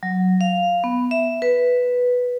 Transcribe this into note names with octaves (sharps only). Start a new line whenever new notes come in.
F#3
F5
B3
E5
B4